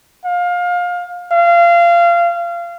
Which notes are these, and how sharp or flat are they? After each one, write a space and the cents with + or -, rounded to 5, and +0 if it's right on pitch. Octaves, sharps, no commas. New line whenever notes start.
F5 +25
F5 -25